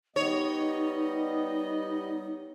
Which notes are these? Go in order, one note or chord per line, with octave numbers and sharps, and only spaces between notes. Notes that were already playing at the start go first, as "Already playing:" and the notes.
G3 B3 D#4 C#5 D#5